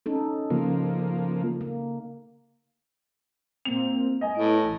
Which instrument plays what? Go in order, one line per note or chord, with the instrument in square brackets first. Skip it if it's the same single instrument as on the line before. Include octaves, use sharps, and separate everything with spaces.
[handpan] C#4 D#4 A4
[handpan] C#3 [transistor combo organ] F3 A#3
[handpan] A#3
[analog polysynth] A#2 A#3 C4 [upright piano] F7
[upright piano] D#5 G#5
[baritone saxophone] A2 [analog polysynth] B3 E4 D7
[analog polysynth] A1